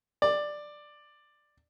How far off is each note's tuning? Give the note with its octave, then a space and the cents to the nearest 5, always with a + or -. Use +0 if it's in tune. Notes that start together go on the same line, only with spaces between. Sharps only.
D5 +10